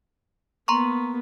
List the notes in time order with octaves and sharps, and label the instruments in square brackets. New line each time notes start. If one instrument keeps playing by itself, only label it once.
[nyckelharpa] A#3 B3 [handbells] A#5 C6 C#6